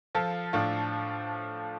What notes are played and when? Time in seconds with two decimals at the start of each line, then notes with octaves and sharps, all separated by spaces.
0.15 F3 F4 A4
0.53 A2 D4 F4